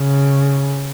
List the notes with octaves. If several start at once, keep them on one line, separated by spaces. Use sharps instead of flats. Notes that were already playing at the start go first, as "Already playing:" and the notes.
Already playing: C#3